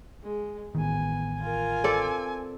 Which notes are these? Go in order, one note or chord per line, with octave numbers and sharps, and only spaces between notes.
G#3
A1 D#3 B3 G#5
F4 A#4 G#5
C4 A4 D5